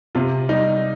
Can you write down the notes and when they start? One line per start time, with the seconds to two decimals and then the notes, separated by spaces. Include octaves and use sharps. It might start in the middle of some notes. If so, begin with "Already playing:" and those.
0.15 C3 F4
0.49 G3 D#4